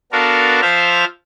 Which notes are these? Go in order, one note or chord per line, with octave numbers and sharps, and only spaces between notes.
B3 D4 F#4 A4 A#4 F5
F3 C5 E5 F5 F6